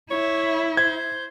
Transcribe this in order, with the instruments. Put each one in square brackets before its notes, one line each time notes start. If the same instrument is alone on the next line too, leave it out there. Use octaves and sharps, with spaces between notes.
[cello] E4 [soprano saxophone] C#5
[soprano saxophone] C5 [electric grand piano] G#6